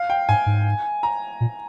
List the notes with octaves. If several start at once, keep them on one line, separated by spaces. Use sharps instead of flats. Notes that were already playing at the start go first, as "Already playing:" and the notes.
Already playing: F5
G5
G#2 G#5
G#2
A#5
A#2